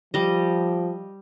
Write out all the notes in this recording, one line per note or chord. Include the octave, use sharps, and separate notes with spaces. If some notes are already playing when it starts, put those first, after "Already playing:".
F3 G3 D#5